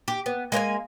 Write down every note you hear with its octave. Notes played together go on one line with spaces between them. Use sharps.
G4
B3
G#3 A#3 B4 G#5